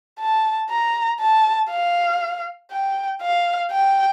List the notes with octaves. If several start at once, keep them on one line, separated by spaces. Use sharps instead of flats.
A5
A#5
A5
F5
G5
F5
G5